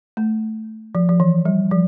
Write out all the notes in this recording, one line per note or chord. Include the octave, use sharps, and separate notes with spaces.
A3
F3
F3
E3
G3
F3